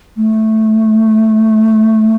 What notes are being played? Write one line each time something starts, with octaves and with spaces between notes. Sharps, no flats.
A3